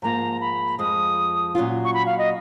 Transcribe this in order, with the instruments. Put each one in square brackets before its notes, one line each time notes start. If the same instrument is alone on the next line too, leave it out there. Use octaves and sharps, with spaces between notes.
[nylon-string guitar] G#2 F3 A#3 F4 [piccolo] A#5
[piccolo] B5
[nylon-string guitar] F2 F3 G#3 [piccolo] D#6
[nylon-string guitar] A#2 F#3 C#4 F4
[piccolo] C#6
B5
F5
D#5